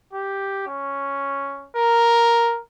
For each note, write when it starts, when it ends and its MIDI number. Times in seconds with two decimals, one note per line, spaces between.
0.13 0.67 67
0.67 1.68 61
1.76 2.59 70